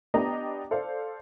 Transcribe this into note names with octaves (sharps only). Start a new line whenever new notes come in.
B3 D4 G4 D#5 G5 A#5
A4 C5 D5 F5